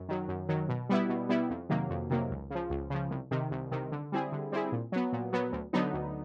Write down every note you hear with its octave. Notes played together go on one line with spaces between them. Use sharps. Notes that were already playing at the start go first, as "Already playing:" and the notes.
Already playing: F#2
D#3 F#3
F#2
D#3 F#3
B2
G3 B3 E4
B2
G3 B3 E4
F2
C3 D#3 F#3 A#3
F2
C3 D#3 F#3 A#3
C#2
C#3 F3
C#2
C#3 F3
C2
C3 D#3
C2
C3 D#3
D3
G3 C4 E4 G#4
D3
G3 C4 E4 G#4
A#2
F#3 B3
A#2
F#3 B3
D2
D3 F#3 B3 D#4
D2